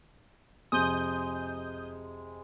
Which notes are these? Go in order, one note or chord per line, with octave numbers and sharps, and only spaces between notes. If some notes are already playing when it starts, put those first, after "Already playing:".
F2 C3 G#3 D#6 G6